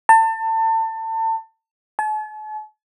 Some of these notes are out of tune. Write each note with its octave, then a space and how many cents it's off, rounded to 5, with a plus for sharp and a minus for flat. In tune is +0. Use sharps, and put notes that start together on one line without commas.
A5 +30
A5 -45